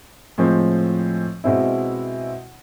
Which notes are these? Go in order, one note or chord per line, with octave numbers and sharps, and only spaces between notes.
A2 F3 G#3 C4
B2 G#3 C4 E4